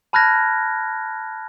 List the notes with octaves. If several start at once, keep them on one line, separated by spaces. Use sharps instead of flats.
A5 B5 F6 F#6 G#6 A#6